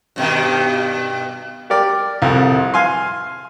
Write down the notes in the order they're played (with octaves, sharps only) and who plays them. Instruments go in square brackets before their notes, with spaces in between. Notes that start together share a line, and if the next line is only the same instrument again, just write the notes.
[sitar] G2 B2 D#3
[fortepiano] G4 A#4 D5
C2 F2
F5 G#5 C6